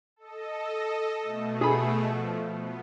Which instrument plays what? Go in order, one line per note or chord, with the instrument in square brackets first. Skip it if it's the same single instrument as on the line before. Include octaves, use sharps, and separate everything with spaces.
[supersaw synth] A4 D#5
B2 A3
[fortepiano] G#4 B5
[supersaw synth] F3
B3